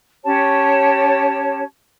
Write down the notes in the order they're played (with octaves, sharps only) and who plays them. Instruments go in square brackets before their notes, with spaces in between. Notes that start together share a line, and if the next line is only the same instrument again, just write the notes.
[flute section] C#4 G4 C#5 A5